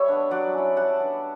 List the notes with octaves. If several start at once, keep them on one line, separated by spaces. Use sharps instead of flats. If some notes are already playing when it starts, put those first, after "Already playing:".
Already playing: G3 C#5 E5
B3 D4
F#3 D5 F#5
C#4 E4
G3 F#5 A5
B3 D4